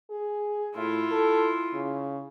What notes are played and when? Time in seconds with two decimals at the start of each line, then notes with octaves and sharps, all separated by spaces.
0.10 G#4
0.76 A2 E4 F4
1.11 A4
1.74 C#3